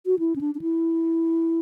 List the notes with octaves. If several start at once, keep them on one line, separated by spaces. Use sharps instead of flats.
F#4
E4
C#4
D4
D4
E4